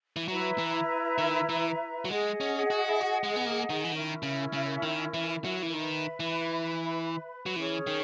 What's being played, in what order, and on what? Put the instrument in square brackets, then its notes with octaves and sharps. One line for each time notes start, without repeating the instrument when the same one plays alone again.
[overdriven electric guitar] E3
[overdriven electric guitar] F#3 [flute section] E4 B4 E5 A#5
[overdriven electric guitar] E3
D#3
E3
F#3
[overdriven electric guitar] G#3 [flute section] G#4 D#5 F#5
[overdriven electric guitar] C#4
F#4
E4
F#4
G#3
B3
A#3
D#3
E3
[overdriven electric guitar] D#3 [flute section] C#4 E4 A#4 E5
[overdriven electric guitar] C#3
C#3
D#3
E3
F#3
E3
[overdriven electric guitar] D#3 [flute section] B4 E5 B5
[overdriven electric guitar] E3
F#3
[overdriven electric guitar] E3 [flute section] C#4 G#4 C#5
[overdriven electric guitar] D#3